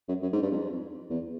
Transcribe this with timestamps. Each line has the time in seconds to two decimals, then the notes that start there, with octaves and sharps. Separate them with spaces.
0.09 F#2
0.23 F#2
0.33 G#2
0.42 G2
0.51 F2
1.10 E2